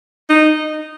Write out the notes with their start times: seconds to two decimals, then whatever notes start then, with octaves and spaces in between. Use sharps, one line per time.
0.29 D#4